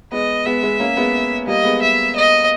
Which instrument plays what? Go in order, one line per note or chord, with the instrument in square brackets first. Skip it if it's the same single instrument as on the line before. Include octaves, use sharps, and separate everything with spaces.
[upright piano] G#3 B3 [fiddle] D#5
[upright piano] G#3 B3 [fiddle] E5
[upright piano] G#3 B3
A#3 C#4
G#3 B3
[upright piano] G3 A#3 [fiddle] D#5
[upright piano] G#3 B3
[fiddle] E5
D#5